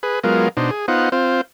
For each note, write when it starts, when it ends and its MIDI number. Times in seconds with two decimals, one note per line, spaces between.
0.03 0.19 68
0.03 0.19 71
0.24 0.48 54
0.24 0.48 56
0.24 0.48 59
0.24 0.48 65
0.24 0.48 70
0.57 0.71 47
0.57 0.71 62
0.57 0.71 63
0.57 0.71 72
0.71 0.86 68
0.88 1.09 59
0.88 1.09 63
0.88 1.09 65
0.88 1.09 72
0.88 1.09 78
1.12 1.41 60
1.12 1.41 65
1.12 1.41 72